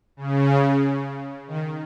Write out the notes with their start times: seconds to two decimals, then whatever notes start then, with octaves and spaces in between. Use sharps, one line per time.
0.17 C#3
1.48 D#3